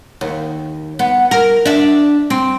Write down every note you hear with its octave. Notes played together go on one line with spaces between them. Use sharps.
D#2
B3
A#4
D4 E5
C4